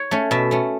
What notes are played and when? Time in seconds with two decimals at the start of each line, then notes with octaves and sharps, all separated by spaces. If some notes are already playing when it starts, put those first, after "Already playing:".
Already playing: C#5
0.11 A3 C#4
0.31 B2 E5
0.51 A3 C#4